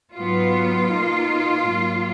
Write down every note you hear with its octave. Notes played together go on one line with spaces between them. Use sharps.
G#2 F#3 B3 F4
B2 A#3 D#4
G#2 F#3 A#3